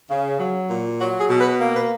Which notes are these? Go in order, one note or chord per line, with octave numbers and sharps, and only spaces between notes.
C#3
F#3
A#2
F#3 F#4
G#4
B2
B4
A#3
B4